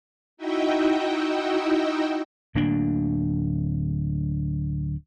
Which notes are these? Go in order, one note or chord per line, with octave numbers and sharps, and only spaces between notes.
D#4 E4 F#4 D#5 E5 G5
D1 D2 A#3 D4